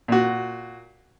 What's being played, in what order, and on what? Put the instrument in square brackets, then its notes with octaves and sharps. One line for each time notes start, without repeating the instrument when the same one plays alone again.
[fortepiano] A#2 F#4